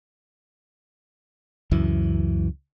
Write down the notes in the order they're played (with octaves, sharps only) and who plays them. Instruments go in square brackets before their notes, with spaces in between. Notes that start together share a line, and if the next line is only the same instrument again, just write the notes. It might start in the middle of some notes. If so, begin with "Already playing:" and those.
[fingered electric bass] C#2 F#2 E3